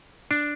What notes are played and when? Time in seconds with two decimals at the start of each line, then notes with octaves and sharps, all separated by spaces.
0.31 D4